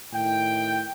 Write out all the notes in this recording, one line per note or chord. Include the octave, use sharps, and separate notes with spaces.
A2 D#3 E4 G5